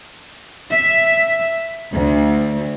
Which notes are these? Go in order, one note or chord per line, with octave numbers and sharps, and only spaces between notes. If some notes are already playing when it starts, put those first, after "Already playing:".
E5
D2